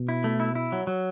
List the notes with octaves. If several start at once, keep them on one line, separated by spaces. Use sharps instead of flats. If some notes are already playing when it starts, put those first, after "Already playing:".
Already playing: B2
E4
A3
E4
E4
F#3
F#3